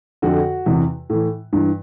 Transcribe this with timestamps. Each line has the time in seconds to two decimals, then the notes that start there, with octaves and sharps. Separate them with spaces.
0.22 F2 D3 F#4
0.66 E2 C3 E3
1.09 A2 E3
1.53 G2 E3